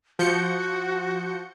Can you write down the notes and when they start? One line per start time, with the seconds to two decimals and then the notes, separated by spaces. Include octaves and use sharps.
0.19 F3 F#4 G6 C#7